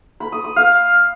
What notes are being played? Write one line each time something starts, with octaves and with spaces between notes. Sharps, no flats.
B5
D#6
D#6
F5